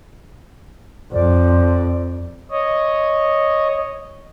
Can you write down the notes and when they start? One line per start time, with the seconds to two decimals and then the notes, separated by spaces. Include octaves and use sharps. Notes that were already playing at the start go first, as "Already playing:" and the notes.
1.13 F2 C5 D5
2.51 C#5 D#5